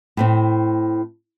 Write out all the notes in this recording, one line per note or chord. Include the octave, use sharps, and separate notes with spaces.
A2 A3 C4